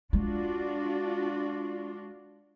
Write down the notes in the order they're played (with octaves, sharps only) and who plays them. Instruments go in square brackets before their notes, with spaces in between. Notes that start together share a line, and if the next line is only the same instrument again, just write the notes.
[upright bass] G#3 [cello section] D4 F4 F#4